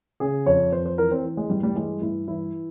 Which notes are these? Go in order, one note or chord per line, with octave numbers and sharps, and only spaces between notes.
C#3 G#4
F2 C#5
F2 C5
C5
E3 A#4
C4
E3
G#3
G2 G3
G3
E3 G#3
G2 E4
E3 E4